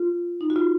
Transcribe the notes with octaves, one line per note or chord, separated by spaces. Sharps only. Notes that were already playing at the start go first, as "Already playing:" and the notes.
Already playing: F4
D#4
F#4
F4